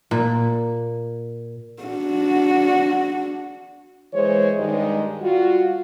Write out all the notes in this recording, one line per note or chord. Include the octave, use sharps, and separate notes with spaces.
A#2
D4 F#4
E3 G#3 C5 C#5
G2 D#3 G3 G#3
G3 F4 F#4